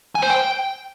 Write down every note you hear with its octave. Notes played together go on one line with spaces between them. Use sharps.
G#5
C5
G5